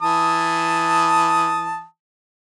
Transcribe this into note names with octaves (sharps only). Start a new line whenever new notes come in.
E3 A5 D#6